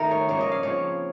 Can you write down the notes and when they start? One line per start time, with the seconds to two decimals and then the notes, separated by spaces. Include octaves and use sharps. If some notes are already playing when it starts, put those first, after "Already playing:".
Already playing: D#3 A3 D#4 A#4
0.11 C#5
0.28 C#3 F3 A#3 C#5
0.41 D#5
0.52 F5
0.63 C#3 F3 C4 C#5